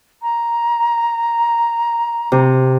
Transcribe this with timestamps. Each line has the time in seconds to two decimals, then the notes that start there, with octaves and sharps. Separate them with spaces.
0.22 A#5
2.32 C3